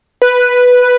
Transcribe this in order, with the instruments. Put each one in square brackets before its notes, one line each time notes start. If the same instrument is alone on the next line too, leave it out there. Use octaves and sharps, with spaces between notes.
[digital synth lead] B4